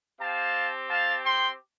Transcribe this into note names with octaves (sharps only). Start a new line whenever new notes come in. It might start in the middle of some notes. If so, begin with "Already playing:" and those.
C4 G4 F5 A5
F5 A5
G5 C6